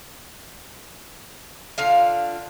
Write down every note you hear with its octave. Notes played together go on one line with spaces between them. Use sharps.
D3 F4 F5